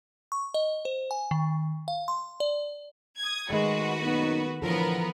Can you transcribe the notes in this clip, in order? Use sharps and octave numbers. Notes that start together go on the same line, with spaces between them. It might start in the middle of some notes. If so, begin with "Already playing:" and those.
C#6
D#5
C5
G#5
D#3
F5
C6
D5
D#6 G#6
D#3 G#3 A3 F#4 B4
F#2 A#2 B3 D#4
A2 D3 E3 F3 B3 A4 A#4 B5